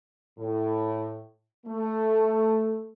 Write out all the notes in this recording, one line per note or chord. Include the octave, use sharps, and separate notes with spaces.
A2
A3